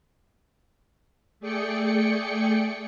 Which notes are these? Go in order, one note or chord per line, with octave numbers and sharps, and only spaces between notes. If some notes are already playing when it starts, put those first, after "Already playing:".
A3 G#4 D5 G5 C#7